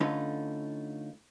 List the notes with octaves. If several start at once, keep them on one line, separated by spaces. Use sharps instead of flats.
D3 A3 C#4 D#4 F4 B4